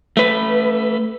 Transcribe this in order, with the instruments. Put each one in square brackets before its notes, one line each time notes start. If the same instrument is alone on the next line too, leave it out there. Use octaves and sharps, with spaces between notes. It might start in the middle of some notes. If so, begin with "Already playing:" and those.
[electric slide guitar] A3 B4